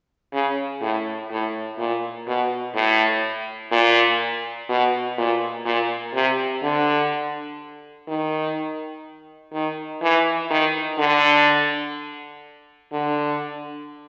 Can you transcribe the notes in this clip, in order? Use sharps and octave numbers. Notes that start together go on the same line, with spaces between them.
C#3
A2
A2
A#2
B2
A2
A#2
B2
A#2
A#2
C3
D3
D#3
D#3
E3
D#3
D3
D3